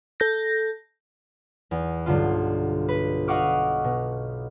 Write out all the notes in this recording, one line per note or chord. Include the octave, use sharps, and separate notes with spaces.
A4 G6 A#6
E2
B1 G2 D3 F4
B4
D#5 F5 F#5 C#6 D6 F6
B2